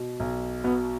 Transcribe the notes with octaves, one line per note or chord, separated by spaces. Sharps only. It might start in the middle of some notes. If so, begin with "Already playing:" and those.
Already playing: B2
B1
B2 B3